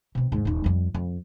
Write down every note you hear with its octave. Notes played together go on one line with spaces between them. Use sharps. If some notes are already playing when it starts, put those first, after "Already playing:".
B2 C4
D#2 G#2
D#1 D#4
F2 G3
F2